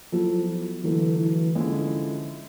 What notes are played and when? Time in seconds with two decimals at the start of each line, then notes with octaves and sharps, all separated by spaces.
0.12 F3 F#3 B3 E4 A4
0.84 D3 E3 F#3 A3
1.19 E3
1.55 D3 F3 G#3 C#4 E4